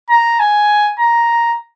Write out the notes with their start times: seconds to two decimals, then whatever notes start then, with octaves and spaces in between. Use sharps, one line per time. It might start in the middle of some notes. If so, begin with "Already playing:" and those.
0.10 A#5
0.40 G#5
1.00 A#5